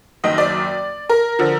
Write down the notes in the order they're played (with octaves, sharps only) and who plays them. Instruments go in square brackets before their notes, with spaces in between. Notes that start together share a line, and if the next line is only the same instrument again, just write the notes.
[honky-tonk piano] F#1 F#2 D#3 D#5
D5
A#4
D3 F3